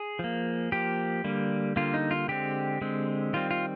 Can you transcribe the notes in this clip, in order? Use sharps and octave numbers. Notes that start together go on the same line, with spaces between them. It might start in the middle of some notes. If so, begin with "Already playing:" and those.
Already playing: G#4
F3 A#3
F3 A#3 G4
D3 G3 A#3
D3 G3 A#3 F4
D#4
F4
D3 G#3 C4 G4
D3 G#3 C4
D#3 G3 C4 F4
F4